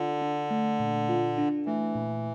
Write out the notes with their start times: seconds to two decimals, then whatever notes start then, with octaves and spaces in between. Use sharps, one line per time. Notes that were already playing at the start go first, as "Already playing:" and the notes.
Already playing: D3 F4
0.22 D4
0.50 A3
0.80 A#2
1.09 F4
1.38 D4
1.66 E3 A3
1.95 A#2